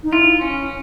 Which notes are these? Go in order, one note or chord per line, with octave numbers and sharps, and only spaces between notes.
D#4
E4 F4
C#4